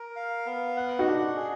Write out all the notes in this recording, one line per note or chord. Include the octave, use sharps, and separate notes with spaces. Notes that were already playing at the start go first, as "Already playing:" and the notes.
Already playing: A#4
F5
B3
F#5
D#4 F#4
D4
G#4